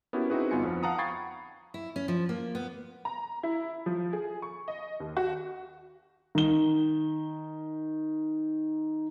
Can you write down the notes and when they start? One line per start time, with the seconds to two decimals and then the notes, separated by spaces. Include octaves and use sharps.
0.13 B3 C#4 E4 F#4 G4 A#4
0.30 C4 D#4 E4 F#4 G#4 B4
0.51 G1 B3 D#4 F4 G#5 C#7
0.63 F2 F3
0.83 F5 F#5 A5 A#5 D#6
0.98 G5 B5 C#6 G#6 A6 C7
1.74 E4
1.96 C#4
2.08 F3
2.29 A#3
2.55 B3
3.05 A#5
3.43 E4
3.86 F3
4.13 G#4
4.42 C#6
4.68 D#5
5.00 D#2
5.17 F#4
6.35 D#3 G7